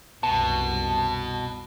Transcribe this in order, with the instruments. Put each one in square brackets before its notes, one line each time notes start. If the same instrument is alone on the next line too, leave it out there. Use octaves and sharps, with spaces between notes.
[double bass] C2 F#2 [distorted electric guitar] B2 [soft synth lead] A5